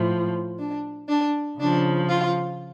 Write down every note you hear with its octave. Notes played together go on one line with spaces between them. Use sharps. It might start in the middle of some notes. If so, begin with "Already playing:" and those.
Already playing: A2 F3
D4
D4
C#3 F3 D4
F4